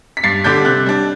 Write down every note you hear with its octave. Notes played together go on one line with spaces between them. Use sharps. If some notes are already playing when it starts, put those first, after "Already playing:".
B6
G2 A6 C7
D3 G3 D4 G6 B6
C3 F#6 A6
G3 D4